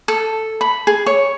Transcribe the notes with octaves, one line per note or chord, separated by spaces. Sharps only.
A4
B5
G#4
C#5